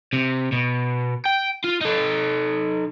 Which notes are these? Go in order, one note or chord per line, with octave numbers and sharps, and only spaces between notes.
C3
B2
G5
F4
D#4 A4